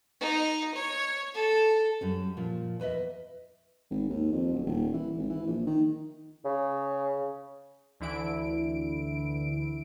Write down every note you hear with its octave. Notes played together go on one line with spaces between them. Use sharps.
D#4
C#5
A4
F#2 G3 C#4
A#2 F3
E2 B4 D#5 E5
G#1
D#2
F2
D1
D#1
E3
G#1
E3
A#1
D#3
C#3
D2 D3 E3 E4 D7